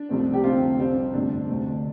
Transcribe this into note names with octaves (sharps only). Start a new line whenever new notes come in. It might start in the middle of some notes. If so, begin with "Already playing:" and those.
Already playing: D4
C2 C3 F3 A3 C4
G4
F2 D3 A3 C4 F4
C2 C3 G3 C4
G1 F2 C3 A3 D4
D2 C3 A3